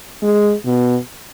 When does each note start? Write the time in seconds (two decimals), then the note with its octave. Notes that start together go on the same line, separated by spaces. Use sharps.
0.22 G#3
0.66 B2